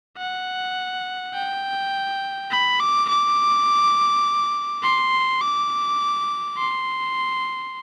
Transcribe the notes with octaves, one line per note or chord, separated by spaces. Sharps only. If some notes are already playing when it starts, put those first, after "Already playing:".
F#5
G5
B5
D6
D6
C6
D6
C6